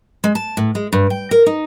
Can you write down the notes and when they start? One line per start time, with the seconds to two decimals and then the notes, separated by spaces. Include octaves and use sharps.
0.24 G#3
0.35 A5
0.57 A2
0.75 G#3
0.93 G2
1.10 G5
1.31 A#4
1.46 D#4